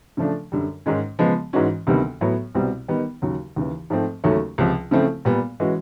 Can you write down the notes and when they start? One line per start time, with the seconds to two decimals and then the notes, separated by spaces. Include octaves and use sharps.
0.17 C#3 F3 A3 D4
0.52 F#2 D3 G3
0.86 G#2 D#3 G#3 C#4
1.19 C#3 F3 G#3 B3
1.53 G#2 E3 G#3 C#4 F#4
1.87 D2 C3 D#3 G3 B3
2.21 A2 F#3 B3
2.55 C2 B2 G3 C4
2.88 D#3 G3 B3 D#4
3.22 D#2 C#3 F#3
3.56 D#2 C#3 E3
3.90 G#2 F3 A3 C4
4.24 D#2 C#3 F#3 A3 C#4
4.58 C#2 C3 F3
4.91 C#3 F3 A3 C4 E4
5.25 A#2 G3 B3
5.60 E3 G#3 C#4 F#4